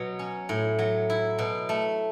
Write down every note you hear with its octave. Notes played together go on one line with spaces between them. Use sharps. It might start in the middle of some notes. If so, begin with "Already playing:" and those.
Already playing: B2 F#3
C#4
A2
F#3
E4
B2
A3